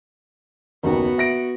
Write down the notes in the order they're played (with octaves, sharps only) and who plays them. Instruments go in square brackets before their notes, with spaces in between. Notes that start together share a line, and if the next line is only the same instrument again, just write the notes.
[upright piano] F#1 D#2 [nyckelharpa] B3 F#4
[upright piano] E5 A#6 D7